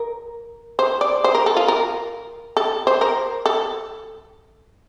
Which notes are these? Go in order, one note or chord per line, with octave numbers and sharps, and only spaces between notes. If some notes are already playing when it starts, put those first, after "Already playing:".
Already playing: A#4
C5
D5
C5
A#4
A4
F4
A#4
A4
C5
A#4
A4